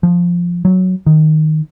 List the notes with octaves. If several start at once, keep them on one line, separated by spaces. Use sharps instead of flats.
F3
F#3
D#3